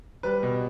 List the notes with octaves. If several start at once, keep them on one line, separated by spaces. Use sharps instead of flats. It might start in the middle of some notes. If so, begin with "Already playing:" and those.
G3 B4
B2